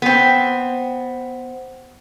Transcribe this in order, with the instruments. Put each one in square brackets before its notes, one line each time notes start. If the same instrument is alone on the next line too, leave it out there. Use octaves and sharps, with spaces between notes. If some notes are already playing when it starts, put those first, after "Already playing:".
[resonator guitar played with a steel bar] B3 C4